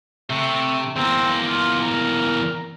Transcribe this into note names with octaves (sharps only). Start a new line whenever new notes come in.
C3 A3
E2 A#3 C4
F4
A#4